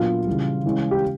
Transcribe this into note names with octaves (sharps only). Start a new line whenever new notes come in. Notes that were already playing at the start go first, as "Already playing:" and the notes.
Already playing: A#2 F#3 B3 D4 F4
C#3 E3 G3
C#3 E3 G#3 C#4
G4